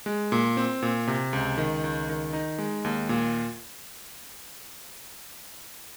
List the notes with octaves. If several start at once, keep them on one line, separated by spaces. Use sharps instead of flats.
G#3
A#2
C4
A#2
C3
C#2
D#3
C#2
D#3
D#4
G#3
D#2
A#2